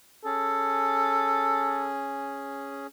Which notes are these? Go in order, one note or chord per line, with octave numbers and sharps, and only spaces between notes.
C#4 G#4 A4